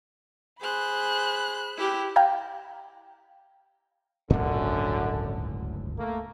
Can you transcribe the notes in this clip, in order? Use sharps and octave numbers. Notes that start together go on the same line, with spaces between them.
G#4 C5 B5 F#6
E4 G4
F5 G5 A#5 G#6
D1 G1 C#2 F#2 A2 D3 C#4 D4
A3 A#3